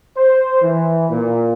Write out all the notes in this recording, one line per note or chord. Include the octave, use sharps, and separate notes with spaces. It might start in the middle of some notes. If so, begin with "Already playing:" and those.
C5
E3
A#2